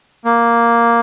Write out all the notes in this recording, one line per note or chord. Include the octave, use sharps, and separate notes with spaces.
A#3